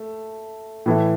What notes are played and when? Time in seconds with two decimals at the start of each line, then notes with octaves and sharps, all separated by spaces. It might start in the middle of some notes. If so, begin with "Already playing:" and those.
Already playing: A3
0.86 A2 E3 A3 E4